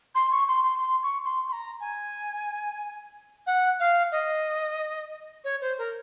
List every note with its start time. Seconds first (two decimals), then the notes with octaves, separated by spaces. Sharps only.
0.15 C6
0.32 C#6
0.48 C6
0.64 C6
0.81 C6
1.03 C#6
1.25 C6
1.48 C6
1.53 A#5
1.80 G#5
3.47 F#5
3.80 F5
4.12 D#5
5.44 C#5
5.61 C5
5.78 A#4